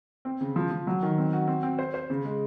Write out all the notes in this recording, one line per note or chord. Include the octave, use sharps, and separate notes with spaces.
C4
C#3
F3
F3
F#3
D#3
C4
F#4
C4
C4
C5
C5
C#3
G#3